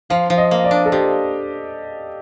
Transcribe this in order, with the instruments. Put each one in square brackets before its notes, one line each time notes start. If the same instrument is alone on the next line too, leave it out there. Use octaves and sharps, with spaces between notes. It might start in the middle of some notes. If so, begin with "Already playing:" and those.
[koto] F3 [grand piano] F5
[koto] F3
[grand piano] D#5
[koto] A#3
[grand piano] D5
[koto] D4
[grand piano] A4
[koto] F3 [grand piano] G4